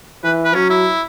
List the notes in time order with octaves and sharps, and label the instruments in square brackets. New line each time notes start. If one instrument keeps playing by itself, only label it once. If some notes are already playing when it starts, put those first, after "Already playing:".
[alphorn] E3 [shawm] B4
[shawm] B4
[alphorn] F#3 [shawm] C#4
[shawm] E4